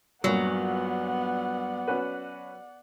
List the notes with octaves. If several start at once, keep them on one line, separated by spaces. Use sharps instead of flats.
G2 A#2 F#3 B3 D5 F#5
C#4 F#4 B4